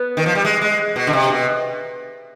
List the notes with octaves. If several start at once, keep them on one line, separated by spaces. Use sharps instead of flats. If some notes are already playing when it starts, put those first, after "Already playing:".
Already playing: B3
D#3
F3
G3
G#3
G#3
B2
D3
C3
B2